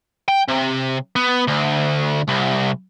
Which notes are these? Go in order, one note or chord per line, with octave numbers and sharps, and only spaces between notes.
G5
C3
B3
D2
C2